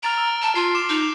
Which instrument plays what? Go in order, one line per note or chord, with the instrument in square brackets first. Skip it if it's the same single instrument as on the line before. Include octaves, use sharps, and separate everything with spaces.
[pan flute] A#5 [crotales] F6 A6 D7
[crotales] E6
[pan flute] A5
[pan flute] F4 [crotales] C7
[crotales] D6 C7 E7
[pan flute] D#4